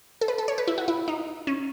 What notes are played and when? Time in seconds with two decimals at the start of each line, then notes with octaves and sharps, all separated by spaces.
0.21 A4
0.28 B4
0.38 A4
0.48 C#5
0.58 B4
0.68 E4
0.78 F#4
0.88 E4
1.08 D#4
1.47 C#4